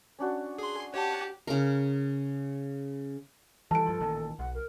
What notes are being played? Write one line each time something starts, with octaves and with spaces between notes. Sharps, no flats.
C#4 D4 F#4
G#4 C6
G4 C#5 F#5 A5
C#3 A#4
E3 G3 A4 A5 D7
G2 F3
A1 A#2 D#3
B1 F#5
A#4